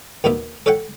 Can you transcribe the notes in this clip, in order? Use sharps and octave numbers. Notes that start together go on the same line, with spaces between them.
D#2 B2 A#3 D#4 E5
A4 C#5 E5 F#5 G5